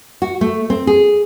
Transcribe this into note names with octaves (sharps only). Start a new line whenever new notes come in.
F#4
A3
C4
G#4